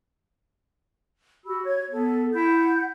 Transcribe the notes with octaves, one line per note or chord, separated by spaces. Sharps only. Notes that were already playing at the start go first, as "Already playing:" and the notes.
F#4 G4 B5 E6
C#5 G#6
B3 A4
E4 F#5 G6